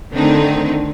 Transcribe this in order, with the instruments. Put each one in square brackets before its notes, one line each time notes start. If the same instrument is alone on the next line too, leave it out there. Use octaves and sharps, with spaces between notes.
[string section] D3 D#3 A3 C4 D4 D#4